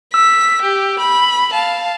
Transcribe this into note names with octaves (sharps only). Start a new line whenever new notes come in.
E6 B6
G4
B5
F5 A5